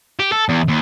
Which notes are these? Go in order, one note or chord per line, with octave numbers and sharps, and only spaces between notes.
G4
A4
E2
D#2